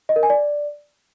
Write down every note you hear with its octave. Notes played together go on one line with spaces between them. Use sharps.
D#5
A#4
G#5
D5